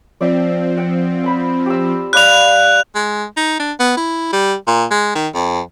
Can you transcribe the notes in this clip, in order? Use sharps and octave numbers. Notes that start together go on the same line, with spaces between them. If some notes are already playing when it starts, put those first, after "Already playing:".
F3 C4 D5 E5 G5
F#5 G5
G#5 B5
G4 E6
D5 F5 B5 F#6 F7
G#3
D#4
D4
B3
E4
G3
A#2
G#3
D#3
F2